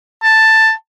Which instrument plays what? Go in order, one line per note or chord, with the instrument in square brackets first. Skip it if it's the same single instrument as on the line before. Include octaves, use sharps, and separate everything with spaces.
[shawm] A5